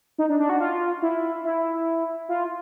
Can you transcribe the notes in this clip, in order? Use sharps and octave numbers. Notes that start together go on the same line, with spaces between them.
D#4
D4
D4
F#4
F4
E4
E4
F4